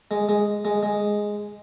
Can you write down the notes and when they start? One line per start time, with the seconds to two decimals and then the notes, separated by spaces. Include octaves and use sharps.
0.11 G#3
0.29 G#3
0.65 G#3
0.83 G#3